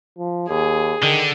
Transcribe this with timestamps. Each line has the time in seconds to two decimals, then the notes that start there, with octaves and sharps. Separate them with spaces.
0.18 F3
0.49 D#2 G#4
1.02 D3 D#3